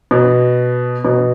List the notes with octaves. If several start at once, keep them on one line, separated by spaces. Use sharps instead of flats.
B2
B2